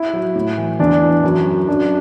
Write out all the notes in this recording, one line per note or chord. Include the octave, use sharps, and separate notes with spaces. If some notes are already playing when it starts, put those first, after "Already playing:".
Already playing: E4
F#3
A2
E3
E2 D4
E3
F#2
F#3
F#2 D4